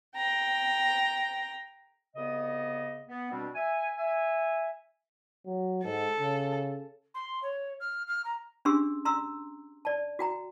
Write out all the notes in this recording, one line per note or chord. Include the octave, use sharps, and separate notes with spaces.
G5 A#5
C2 C#3 B3 D5 D#5
B3
B2 G3 C4 D4
E5 G#5
E5 G#5
F#3
G#2 A4
C#3
C6
C#5
F6
F6
A#5
C#4 D4 G4 G#4 C6 E6
A#5 C6 E6
D5 A5
F#4 G5 A#5